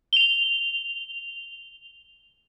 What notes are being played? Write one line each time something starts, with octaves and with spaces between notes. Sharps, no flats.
F7 G7